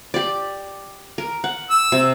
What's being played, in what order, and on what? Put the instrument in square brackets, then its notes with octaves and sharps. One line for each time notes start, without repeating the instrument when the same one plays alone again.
[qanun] G4 D5
A#4
F#5
[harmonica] E6
[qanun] C3